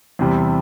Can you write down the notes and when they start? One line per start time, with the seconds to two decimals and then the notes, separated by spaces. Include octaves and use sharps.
0.19 E2 C3 G3